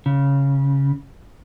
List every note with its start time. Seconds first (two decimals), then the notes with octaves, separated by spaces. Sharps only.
0.06 C#3